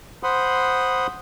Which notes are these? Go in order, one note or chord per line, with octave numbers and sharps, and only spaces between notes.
C5 F#5 B5 C6 D#6